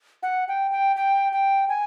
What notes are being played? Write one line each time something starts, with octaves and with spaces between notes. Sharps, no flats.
F#5
G5
G5
G5
G5
G#5